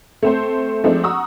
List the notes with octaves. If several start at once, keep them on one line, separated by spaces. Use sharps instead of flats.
A3 C4 C5
F3 G#3 A3 C4 D4 D#4
F#5 A#5 C#6 D#6 E6